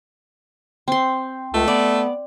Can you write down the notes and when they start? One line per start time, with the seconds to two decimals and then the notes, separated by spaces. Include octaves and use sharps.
0.88 C4 C6
1.54 C#2 A3
1.68 B3 D5